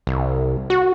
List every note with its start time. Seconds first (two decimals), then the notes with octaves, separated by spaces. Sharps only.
0.07 C2
0.70 F#4